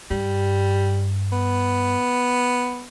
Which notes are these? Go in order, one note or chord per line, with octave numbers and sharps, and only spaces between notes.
G2 G3
B3